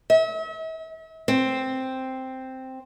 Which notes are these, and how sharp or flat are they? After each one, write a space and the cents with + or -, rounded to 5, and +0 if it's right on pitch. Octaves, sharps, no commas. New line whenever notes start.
E5 -40
C4 +0